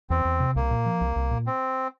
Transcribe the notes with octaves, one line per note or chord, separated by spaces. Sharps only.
E2 C4
E2
C3
C2 A#3
A#2
F3
C2
C2
A#2
C4